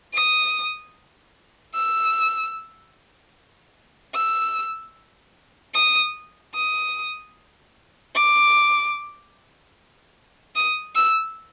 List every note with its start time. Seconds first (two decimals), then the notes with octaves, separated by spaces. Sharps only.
0.14 D#6
1.74 E6
4.14 E6
5.74 D#6
6.55 D#6
8.15 D6
10.56 D#6
10.96 E6